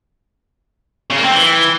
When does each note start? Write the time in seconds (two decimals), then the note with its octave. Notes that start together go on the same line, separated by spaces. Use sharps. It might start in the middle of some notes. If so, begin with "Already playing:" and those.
1.10 C#3
1.17 A#3
1.24 C4
1.31 E3